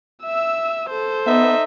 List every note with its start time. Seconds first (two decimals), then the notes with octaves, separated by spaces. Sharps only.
0.24 E5 E6
0.90 A4 C5
1.26 B3 D#4 E5